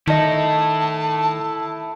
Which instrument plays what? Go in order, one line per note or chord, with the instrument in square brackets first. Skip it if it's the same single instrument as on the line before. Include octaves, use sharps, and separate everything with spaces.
[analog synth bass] D#3 [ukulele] D#4 D#5 [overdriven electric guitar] E4 A4 [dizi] A5